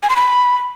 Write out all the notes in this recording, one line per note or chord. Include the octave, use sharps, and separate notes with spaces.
G#5
C6
B5